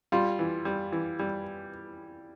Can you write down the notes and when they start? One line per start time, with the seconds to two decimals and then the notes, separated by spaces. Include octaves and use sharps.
0.12 G3 F4
0.39 E3
0.65 G3
0.92 E3
1.19 G3